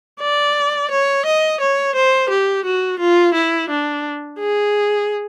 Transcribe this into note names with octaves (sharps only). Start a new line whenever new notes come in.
D5
C#5
D#5
C#5
C5
G4
F#4
F4
E4
D4
G#4